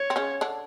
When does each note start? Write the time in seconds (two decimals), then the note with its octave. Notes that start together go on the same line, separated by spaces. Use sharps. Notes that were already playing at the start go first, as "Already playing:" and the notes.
Already playing: C#5
0.10 C4
0.16 C#3 C#4
0.41 D3 D4